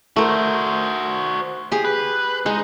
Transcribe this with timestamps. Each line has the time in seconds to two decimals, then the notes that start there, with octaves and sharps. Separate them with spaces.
0.16 A3 F#4 A#4 C5
1.72 G4 G#4
1.85 B4
2.46 G#3 D#4